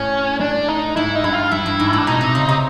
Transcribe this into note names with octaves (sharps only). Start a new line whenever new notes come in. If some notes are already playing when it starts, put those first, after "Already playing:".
Already playing: A2 C#4
D4
D#4
G#2 E4
D#4
G2 E4
F4
G2 E4
G2
G#2
A2 D4
B2 D#4
C3
C#3
C3